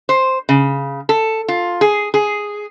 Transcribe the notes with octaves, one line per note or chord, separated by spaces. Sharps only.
C5
C#3
A4
F4
G#4
G#4